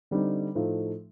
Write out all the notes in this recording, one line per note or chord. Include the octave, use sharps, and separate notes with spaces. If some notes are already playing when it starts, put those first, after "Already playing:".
D3 G3 C4 D#4
A2 F3 A3 D#4